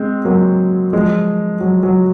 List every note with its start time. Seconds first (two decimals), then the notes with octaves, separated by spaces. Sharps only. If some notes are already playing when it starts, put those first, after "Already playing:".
Already playing: G#3 C4
0.25 F#3 A#3
0.93 F3 G#3
1.61 F#3
1.83 F#3